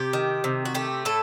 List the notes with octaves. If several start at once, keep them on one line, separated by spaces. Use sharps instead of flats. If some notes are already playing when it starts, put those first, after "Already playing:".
Already playing: C3 G4
D#3
C3
F#4
A3 G4
A2 A4